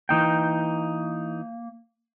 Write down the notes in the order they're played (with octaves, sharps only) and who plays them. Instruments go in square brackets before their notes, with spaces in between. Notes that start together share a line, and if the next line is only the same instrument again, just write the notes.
[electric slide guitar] E3 D#4 G5 [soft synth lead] A#3